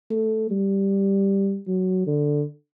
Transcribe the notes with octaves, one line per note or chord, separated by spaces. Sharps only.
A3
G3
F#3
D3